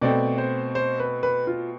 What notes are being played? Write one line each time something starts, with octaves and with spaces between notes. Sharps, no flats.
B2 A3 C4 D5
C5
C5
B4
B4
F4